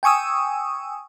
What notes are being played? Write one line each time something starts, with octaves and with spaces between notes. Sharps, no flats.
G5 G#5 C#6 D#6 E6